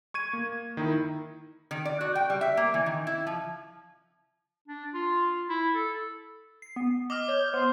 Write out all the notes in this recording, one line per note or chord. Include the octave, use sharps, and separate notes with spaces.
C#6 G#6 D#7
A#3
D#3 D#4 E4
D#3
D5
F#4
G5
G3
E5
A#3
E3
D#3
E4
F3
D4
F4
E4
A4
C7
B3
D#5 D6 D#6 F6
C#5 G6
B3 C5